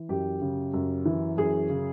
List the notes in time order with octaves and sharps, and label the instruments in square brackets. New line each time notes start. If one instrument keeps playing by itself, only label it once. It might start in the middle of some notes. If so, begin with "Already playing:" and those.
Already playing: [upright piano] E3
F#2 G4
C#3
F#2
E3
F#2 G#4
C#3